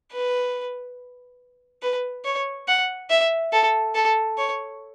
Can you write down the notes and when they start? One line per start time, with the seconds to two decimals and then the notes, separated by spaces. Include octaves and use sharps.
0.13 B4
1.82 B4
2.25 C#5
2.68 F#5
3.10 E5
3.52 A4
3.95 A4
4.38 C#5